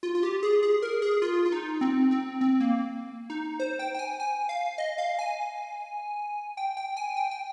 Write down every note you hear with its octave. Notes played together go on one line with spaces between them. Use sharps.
F4
F4
G4
G#4
G#4
A#4
G#4
F4
F4
D#4
C4
C4
C4
A#3
D#4
C5
G5
G5
G#5
G#5
F5
D#5
F5
G#5
G5
G5
G#5
G5
G5